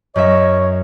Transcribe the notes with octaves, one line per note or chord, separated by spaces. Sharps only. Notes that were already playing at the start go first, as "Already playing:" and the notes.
F#2 C#4 C#5 D#5 E5